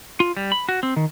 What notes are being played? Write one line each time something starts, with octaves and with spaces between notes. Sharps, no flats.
F4
G3
B5
F#4
C4
D#3